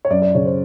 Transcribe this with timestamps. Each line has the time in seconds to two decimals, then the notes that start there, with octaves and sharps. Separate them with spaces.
0.05 C#5
0.10 F#2 D5
0.22 D5
0.35 C#3 C#5
0.45 C5